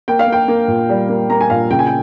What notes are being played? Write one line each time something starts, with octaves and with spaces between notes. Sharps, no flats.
A#3 G5
F5
A#3
G5
A#3
A#2
G3
A#3
A#3 A#5
G#5
A#2 F5
C#3 G5
G#5
G5